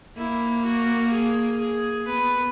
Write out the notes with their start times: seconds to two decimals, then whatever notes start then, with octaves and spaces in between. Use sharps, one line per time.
0.17 A#3 E4
0.64 F#4
1.11 G#4
1.59 G#4
2.06 B3 B4